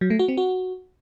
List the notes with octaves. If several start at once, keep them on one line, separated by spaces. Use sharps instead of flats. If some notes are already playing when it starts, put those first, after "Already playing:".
F#3
A3
F#4
C4
F#4